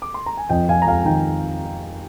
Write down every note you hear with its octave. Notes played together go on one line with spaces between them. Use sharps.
D6
C6
A#5
G#5
F2 D#5 G5
F2 F5 G#5
A#5
F2 F5 G#5
G#5
D#3 G5 A#5